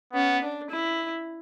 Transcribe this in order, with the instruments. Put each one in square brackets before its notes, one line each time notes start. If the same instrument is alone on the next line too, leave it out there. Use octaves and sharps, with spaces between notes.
[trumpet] B3 [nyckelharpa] C#4
[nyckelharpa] D4
E4